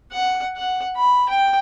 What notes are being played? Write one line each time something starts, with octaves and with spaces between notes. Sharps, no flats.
F#5
F#5
B5
G5